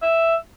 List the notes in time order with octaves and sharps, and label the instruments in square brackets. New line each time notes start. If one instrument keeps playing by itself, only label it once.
[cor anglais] E5